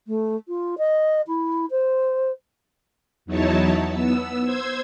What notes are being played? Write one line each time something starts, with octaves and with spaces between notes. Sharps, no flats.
A3
F4
D#5
E4
C5
E2 F#3 D#4 E4 C#5 A5
B3 E6
C5 E6 G#6